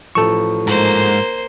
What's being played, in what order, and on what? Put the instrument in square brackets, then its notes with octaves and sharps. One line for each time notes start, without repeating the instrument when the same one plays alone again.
[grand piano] A1 F3 E7 [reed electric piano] A4 C#6
[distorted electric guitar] G#2 [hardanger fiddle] A#3 C5